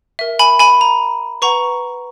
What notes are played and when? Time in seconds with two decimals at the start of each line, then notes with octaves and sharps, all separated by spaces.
0.19 A#4 E5
0.39 G#5 B5
0.59 G#5 B5
0.81 A#5
1.42 B4 F#5 A#5 C#6